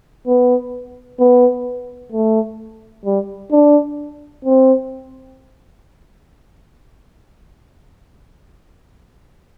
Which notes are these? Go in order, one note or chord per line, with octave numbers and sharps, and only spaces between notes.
B3
B3
A3
G3
D4
C4